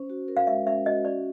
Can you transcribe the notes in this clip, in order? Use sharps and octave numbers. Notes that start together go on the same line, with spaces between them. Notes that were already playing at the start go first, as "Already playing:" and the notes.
Already playing: C#4 C5
F#4
A#4
F5
G#3 E5
C#4 E5
F#4 D#5
C#4 D5